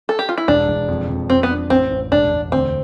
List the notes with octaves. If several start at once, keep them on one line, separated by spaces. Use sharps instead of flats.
A4
G4
F4
E4
E1 D4
E1
F2
F2
F2 C4
B3
D4
A1 C4
A1
E1 D4
E1
D2 C4